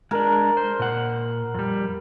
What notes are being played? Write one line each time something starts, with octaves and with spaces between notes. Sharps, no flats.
G#3 D4 A#4
C5
A#2 F#5
F2 G3